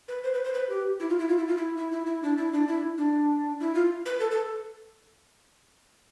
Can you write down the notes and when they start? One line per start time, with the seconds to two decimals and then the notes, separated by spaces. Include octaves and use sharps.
0.08 B4
0.23 C5
0.34 B4
0.44 C5
0.54 B4
0.69 G4
1.00 E4
1.09 F4
1.19 E4
1.29 F4
1.38 E4
1.48 F4
1.57 E4
1.77 E4
1.92 E4
2.06 E4
2.23 D4
2.37 E4
2.53 D4
2.68 E4
2.98 D4
3.60 E4
3.75 F4
4.06 B4
4.20 A4
4.31 A4